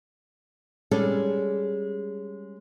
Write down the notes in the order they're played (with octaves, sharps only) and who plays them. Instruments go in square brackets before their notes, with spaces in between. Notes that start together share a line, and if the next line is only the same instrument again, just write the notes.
[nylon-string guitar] G3 G#3 C#4 A4